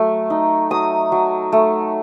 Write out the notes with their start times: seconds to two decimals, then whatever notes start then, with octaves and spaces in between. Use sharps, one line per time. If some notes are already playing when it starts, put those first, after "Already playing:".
Already playing: F#3 A3
0.30 D#4
0.71 F#3 D#6
1.12 F#3
1.52 A3